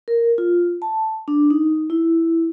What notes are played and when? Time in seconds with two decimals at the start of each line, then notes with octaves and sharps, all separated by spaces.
0.08 A#4
0.38 F4
0.82 A5
1.28 D4
1.50 D#4
1.90 E4